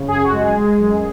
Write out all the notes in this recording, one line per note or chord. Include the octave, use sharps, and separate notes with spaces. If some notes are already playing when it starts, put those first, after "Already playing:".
Already playing: C#3
F#2 G#4
F#4
G#3
G#4
G#3
F#2